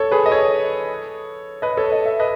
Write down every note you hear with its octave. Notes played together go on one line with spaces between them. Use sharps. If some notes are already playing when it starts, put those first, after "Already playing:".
Already playing: A4 C#5
G#4 B4
D#5
A4 C#5
B4 D#5
A4 C#5
D#5
E5
B4 D#5